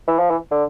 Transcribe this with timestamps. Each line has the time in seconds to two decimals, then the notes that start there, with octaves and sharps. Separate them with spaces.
0.08 E3
0.19 F3
0.30 E3
0.51 D3